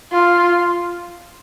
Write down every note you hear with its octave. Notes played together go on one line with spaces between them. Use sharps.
F4